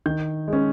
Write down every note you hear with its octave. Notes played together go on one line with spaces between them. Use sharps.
D#3 G6
G#3
C#4